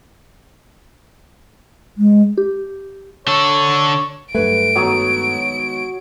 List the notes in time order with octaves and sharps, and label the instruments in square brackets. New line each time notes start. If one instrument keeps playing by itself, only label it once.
[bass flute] G#3
[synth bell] G4
[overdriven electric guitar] D3 A4 [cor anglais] C#5
[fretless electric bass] G2 A3 [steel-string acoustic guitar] F#3 B4 G#5 [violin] D7
[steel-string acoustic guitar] D#3 G#3 B3 [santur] F#3 C#5 D#6